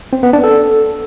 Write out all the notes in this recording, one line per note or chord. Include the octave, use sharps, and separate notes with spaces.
C4
B3
D4
A4